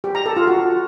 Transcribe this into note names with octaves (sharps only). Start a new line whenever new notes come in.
G4
A#5
A4
F4
F#4